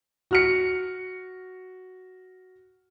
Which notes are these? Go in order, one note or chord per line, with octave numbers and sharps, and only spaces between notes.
F#4 F6 C#7